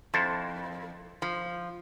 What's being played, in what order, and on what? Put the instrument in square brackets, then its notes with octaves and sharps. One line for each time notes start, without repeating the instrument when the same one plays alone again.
[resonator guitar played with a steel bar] F2 [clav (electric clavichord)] E4 A4 C5
[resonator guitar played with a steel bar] F3